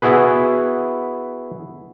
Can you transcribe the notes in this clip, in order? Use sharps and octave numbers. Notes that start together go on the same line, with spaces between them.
B3 E4 F#4 G#4 B4